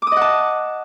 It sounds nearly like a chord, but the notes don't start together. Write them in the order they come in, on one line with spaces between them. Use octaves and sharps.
D6 D#6 D#5 F#5 A5